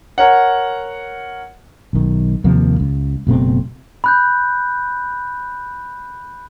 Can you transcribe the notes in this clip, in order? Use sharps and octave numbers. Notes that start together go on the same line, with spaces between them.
A#4 C#5 F#5
B1 D#3
D#2 C3 F3 A#3
C#2
F#1 B2 A3 C4
B5 F#6 G6